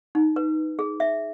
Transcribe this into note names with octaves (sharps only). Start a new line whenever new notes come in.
D#4
B4
G#4
E5